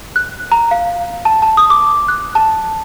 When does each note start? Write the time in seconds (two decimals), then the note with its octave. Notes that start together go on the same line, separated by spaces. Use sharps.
0.16 F#6
0.52 A#5
0.71 F5
1.25 A5
1.42 A5
1.57 D#6
1.70 D6
2.08 F#6
2.35 A5